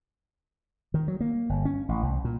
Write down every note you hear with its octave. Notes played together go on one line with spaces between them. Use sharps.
D#3
F#3
A#3
G1
C#4
A1
C2
A#2